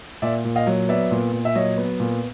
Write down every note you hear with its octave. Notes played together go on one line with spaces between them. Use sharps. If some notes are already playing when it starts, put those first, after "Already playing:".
A#2 D5 E5
A#2
D#5 F5
F#3
B3 D5 E5
A#2
A#2
E5
F#3 C#5 D#5
B3
A#2